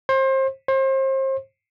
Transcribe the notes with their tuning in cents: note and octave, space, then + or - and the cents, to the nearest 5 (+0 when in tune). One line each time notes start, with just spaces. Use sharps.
C5 +30
C5 +35